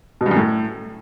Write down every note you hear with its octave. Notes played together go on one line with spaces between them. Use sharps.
B2
G2
F#2
A2